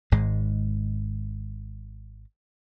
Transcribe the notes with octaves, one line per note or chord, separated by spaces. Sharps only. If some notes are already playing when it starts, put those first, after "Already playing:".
G#1 G#2 G#3